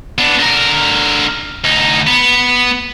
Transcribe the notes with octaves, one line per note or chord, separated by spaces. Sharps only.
B3 D4
D3 A#4
D2 D#4
B3